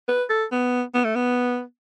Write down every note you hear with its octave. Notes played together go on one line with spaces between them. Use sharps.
B4
A4
B3
B3
A3
B3